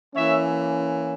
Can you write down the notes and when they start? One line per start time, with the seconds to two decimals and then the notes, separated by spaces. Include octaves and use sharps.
0.14 E3 A#3 C#4 C#5 E5